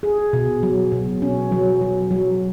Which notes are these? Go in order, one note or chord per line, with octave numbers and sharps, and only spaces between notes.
G#4
B2
F#3
B2
C#4
F#3
F#3
F#3